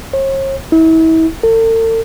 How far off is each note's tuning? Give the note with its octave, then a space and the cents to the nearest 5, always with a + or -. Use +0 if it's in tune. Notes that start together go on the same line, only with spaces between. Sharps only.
C#5 -45
E4 -35
A4 +45